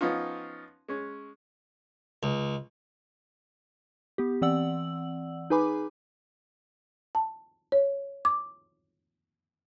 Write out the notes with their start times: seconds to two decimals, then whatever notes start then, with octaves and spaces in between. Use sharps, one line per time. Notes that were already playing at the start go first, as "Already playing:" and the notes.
0.01 F3 B3 C#4 D#4 F4
0.88 G#3 C#4
2.23 C#2
4.18 B3 G4
4.42 E3 C4 D5 F#5 E6 F#7
5.50 D#4 G#4 B4 G#5 B5 D6
7.15 A5
7.72 C#5
8.25 D6